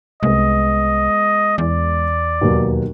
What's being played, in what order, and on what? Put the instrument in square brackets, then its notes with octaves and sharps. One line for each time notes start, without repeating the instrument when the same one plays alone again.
[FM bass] C2 [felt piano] G#3 B3 [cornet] D#5
[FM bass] E2 [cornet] D5
[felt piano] D#2 B2 F#3